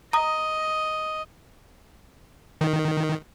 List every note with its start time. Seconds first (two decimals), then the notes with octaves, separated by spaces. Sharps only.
0.13 D#5 A#5 D#6
2.61 D#3